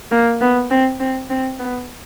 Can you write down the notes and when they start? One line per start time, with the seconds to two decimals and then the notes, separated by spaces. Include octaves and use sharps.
0.11 A#3
0.41 B3
0.71 C4
1.00 C4
1.30 C4
1.59 B3